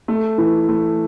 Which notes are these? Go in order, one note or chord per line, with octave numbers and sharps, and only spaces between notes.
A3
E3
A3